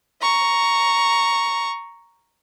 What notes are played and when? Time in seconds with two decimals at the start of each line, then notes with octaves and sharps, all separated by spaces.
0.21 A#5 C#6